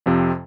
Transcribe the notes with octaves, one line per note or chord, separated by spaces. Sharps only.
F2 C3 F3 C4